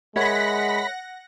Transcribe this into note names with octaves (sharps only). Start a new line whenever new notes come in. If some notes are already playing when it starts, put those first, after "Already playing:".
G#3 A#4 C#5 E5 F#5 B5 A#6